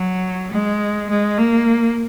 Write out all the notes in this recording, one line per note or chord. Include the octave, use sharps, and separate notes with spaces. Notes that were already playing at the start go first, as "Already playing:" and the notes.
Already playing: F#3
G#3
G#3
A#3